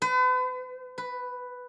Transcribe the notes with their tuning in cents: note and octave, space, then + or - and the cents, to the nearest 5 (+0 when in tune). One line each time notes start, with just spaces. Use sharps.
B4 +40
B4 +5